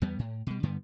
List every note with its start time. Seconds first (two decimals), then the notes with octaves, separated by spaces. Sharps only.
0.02 E2 G3 B3
0.19 A2
0.47 B2 G3
0.63 G2 D3 G3 B3